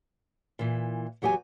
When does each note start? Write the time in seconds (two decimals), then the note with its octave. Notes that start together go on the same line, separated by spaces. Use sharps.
0.59 A#2 E3
1.22 E2 F#3 G4 E5 G#5